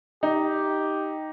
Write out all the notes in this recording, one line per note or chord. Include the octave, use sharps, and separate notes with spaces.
D#4 G4